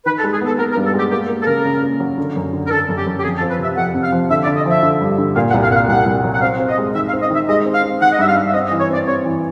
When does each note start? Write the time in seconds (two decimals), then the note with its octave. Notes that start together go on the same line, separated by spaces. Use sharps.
0.06 D#3 B4
0.18 A4
0.23 G#3
0.33 G#4
0.41 B3 A4
0.58 B3 A#4
0.72 A#4
0.76 G2
0.85 A4
0.94 G#3 G4
1.11 A#3 G4
1.29 A#3
1.42 A4
1.46 C#3 A#4
1.65 C#3
1.82 A#3
2.00 F#3
2.18 D3
2.36 F#2
2.53 D3
2.67 A#4
2.70 D3 A4
2.89 F#2
2.97 G4
3.06 F#2
3.19 G4
3.24 F2 G#4
3.38 A4
3.41 F3
3.50 B4
3.59 C3 E5
3.77 F2 F#5
3.94 C3
4.03 F5
4.12 F3
4.30 D3 E5
4.44 D5
4.47 D3
4.56 D#5
4.66 F3 E5
4.83 D3
5.01 G2
5.18 D3
5.36 A#2 F5
5.49 F#5
5.54 C2
5.63 F5
5.71 A#2 F#5
5.75 F5
5.89 C2 F#5
6.06 C2
6.24 F#3
6.34 F#5
6.41 C4 F5
6.59 C4
6.68 D#5
6.78 G#3
6.95 D#3 E5
7.08 F5
7.13 C4
7.22 D#5
7.30 D#3 E5
7.48 G#3 D#5
7.65 C4
7.74 F5
7.84 C4
8.01 D#3 F#5
8.13 D#5
8.19 G2 E5
8.28 F5
8.36 G2
8.47 E5
8.53 C4 D#5
8.67 D#5
8.71 E3
8.80 C#5
8.90 C4 D5
9.07 C4 C#5
9.24 E3